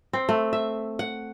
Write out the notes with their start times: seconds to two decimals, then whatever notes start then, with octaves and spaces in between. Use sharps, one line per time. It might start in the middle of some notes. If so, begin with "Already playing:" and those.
0.13 C4
0.29 A3
0.53 E5
0.99 F#5